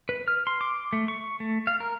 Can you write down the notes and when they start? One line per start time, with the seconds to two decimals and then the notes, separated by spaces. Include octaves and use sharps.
0.09 B4
0.28 F6
0.47 C6
0.61 D6
0.93 A3
1.08 C#6
1.40 A3
1.67 F5
1.80 A#4